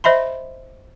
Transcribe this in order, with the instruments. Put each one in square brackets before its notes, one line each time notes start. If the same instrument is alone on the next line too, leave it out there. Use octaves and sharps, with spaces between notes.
[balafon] C5 D#5 E5 B5 C6